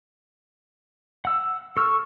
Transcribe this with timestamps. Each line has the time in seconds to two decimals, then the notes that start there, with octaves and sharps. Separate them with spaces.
1.25 F#5 E6
1.77 A4 C#6 E6 F6